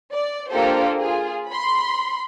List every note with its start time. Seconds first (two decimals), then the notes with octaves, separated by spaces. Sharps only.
0.12 D5
0.49 A#3 D4 F4 G4 A4 C5
0.98 F4 G#4
1.48 B5 C6